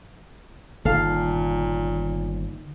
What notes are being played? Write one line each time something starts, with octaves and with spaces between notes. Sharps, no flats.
G1 A#2 D3 D#3 A#3 D#4 A4 F5